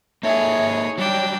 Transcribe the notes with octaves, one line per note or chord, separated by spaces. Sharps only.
A#3 D#4 G#4 A4 C#5 E5
F#3 G3 D4 C#5 G5